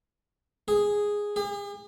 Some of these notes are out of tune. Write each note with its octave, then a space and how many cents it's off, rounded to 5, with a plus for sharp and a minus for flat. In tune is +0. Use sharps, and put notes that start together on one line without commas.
G#4 -5
G#4 -45